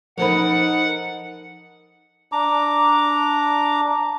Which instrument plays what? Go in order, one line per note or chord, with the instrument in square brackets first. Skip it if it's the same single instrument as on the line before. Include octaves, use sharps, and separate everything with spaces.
[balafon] F3 C5 B5 [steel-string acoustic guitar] D#4 A4 A#4 [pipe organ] F#5
[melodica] D4 A#5 D6